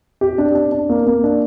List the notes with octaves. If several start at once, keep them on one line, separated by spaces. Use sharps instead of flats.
G4
D4
D4
D4
A#3
A#3
D4